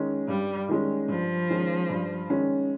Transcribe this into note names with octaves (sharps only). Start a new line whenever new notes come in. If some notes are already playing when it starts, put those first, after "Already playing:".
Already playing: D#3 G#3 C#4
G2 G3
D#3 G#3 C#4
G2 F3
D#3 G#3 C#4
G2
D#3 G#3 C#4